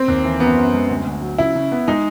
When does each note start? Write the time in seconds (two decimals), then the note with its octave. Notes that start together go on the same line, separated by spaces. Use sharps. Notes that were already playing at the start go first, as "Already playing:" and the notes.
Already playing: C4
0.08 D#2
0.25 E3
0.40 F#2 B3
0.56 F#2
0.74 G#3
0.90 D2
1.06 D2
1.22 F#3
1.38 C#3 E4
1.55 C#3
1.72 B3
1.88 G#3 D#4